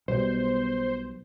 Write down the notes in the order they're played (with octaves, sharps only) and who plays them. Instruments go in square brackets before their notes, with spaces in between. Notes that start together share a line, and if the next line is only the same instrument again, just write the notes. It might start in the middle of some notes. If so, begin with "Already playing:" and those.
[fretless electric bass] B1 B2 G3 [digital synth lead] C5